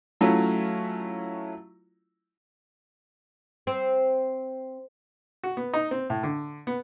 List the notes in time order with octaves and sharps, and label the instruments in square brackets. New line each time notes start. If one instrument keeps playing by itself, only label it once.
[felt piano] F#3 A3 C#4 E4 F4
[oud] C4
[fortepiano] F#4
B3
D#4
C4
A2
D3
B3